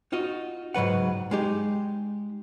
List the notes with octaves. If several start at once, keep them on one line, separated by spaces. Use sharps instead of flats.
D#4 F4 F#4 D#5
C#2 G#2 F#3 B4 F#5
G#3 D#4 G4